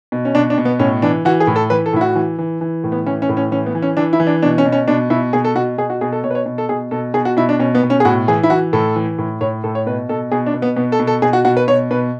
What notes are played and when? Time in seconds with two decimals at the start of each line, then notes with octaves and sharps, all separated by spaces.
0.12 B2
0.25 C#4
0.35 B2 D4
0.50 D4
0.58 B2
0.65 B3
0.79 A2 C#4
1.02 E3 D4
1.25 E3 F#4
1.40 G#4
1.47 A2
1.56 A4
1.70 E3 B4
1.86 A4
1.93 A2 E4
2.01 F#4
2.15 E3
2.38 E3
2.61 E3
2.84 A2
2.92 B3
3.06 E3 C#4
3.22 C#4
3.29 A2
3.37 C#4
3.51 E3 C#4
3.66 B3
3.75 E3
3.82 C#4
3.97 E3 D4
4.13 E4
4.20 E3
4.27 D4
4.43 B2 D4
4.58 C#4
4.66 B2
4.72 C#4
4.88 B2 D4
5.10 B2 E4
5.33 B2 G#4
5.45 A4
5.55 B2 F#4
5.78 B2 G#4
5.90 F#4
6.01 B2 G#4
6.13 A4
6.24 B2 C#5
6.31 B4
6.35 C#5
6.46 B2
6.58 A4
6.69 B2 G#4
6.91 B2 A4
7.14 B2 G#4
7.25 F#4
7.37 B2 E4
7.49 D4
7.59 B2 C#4
7.75 B3
7.83 B2
7.90 C#4
8.00 G#4
8.05 A2 F#4
8.28 E3 G#4
8.43 E4
8.50 E3 F#4
8.73 A2 A4
8.96 E3
9.18 A2
9.41 A2 C#5
9.64 A2 A4
9.75 C#5
9.86 B2 B4
10.09 B2 A4
10.32 B2 G#4
10.47 D4
10.54 B2
10.62 B3
10.76 B2 B3
10.92 A4
11.00 B2
11.07 A4
11.22 B2 G#4
11.33 F#4
11.45 B2 F#4
11.57 B4
11.68 B2 C#5
11.91 B2 B4